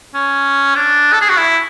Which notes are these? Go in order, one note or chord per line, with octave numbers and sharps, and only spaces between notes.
C#4
D4
A4
G#4
F#4
E4